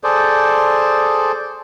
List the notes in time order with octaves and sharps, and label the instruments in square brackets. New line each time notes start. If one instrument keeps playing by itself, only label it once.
[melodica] G#4 A4 C5 D5